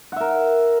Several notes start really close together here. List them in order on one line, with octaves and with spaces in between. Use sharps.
F#5 E5 A#4